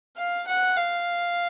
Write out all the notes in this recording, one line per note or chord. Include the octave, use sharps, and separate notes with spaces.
F5
F#5
F5